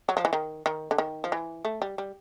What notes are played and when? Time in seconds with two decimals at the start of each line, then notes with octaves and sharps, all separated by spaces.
0.09 F#3
0.17 F3
0.25 E3
0.33 D#3
0.66 D#3
0.91 D3
0.98 D#3
1.24 F3
1.32 E3
1.65 A3
1.82 G3
1.98 G3